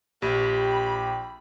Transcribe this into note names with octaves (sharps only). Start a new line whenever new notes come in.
A#1 G4 B5